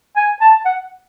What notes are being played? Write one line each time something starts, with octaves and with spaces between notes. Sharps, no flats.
G#5
A5
F#5